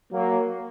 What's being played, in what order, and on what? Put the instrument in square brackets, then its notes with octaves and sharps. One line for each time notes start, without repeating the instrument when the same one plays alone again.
[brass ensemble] F#3 A#3